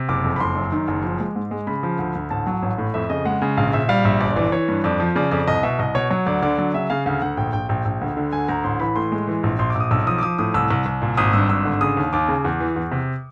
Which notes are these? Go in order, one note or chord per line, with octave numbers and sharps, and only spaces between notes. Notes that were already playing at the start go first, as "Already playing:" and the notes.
Already playing: C3
F#1 D6
F2
B5
F#1 C6
F#2
D#3
F#1
F3
G#3
G#2
G#3
C#3 B5
F3
D2
D2
A1 A5
F#3
A1
A2
F2 E5
C#3 D#5
G#3 F#5
C#3
A#1 F5
A#1 E5
G3 F5
A#1 E5
G1 D5
E3 D5
E3 C#5
G2
F2 D5
F3
C#3 D5
F2 D5
C2 D#5
B2 E5
C2 D#5
B2 C#5
F#3 C#5
D2 D5
D3 D5
F#3
C#3 E5
C#3 F5
D2 F5
D2 F#5
A#1 G5
A#1 G5
A#1 G5
A#1
D2
D3
D2 G#5
D2 A#5
A1 C6
E3 B5
A2 C6
G#3
E3
A#1
A#1 C6
D6
A#1
D#6
B1 E6
F3 D#6
D6
F3 D#6
A2 D#6
C2 E6
C2
C2
A#2
G#1 D#6
G2 E6
G#1 E6
D3
C#3 D#6
D#2
D#2 D6
C#3
E2
E3
E2
C3